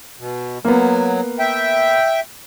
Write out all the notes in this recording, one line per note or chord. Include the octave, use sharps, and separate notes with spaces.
B2
F#3 A#3 B3
E5 G5